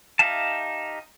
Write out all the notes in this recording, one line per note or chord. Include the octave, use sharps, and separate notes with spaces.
D#4 G4 E5 F5 A5